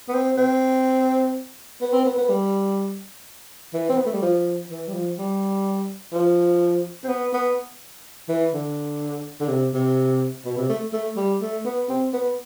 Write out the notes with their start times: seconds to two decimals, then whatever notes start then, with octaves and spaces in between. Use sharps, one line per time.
0.09 B3
0.14 C4
0.38 C4
1.81 B3
1.93 C4
2.05 B3
2.18 B3
2.29 G3
3.73 E3
3.90 C4
3.98 B3
4.06 A3
4.13 G3
4.22 F3
4.69 E3
4.88 G3
4.94 F3
5.18 G3
6.13 F3
7.04 C4
7.09 B3
7.33 B3
8.29 E3
8.54 D3
9.40 D3
9.48 C3
9.74 C3
10.45 B2
10.57 C3
10.69 A3
10.93 A3
11.17 G3
11.41 A3
11.65 B3
11.89 C4
12.13 B3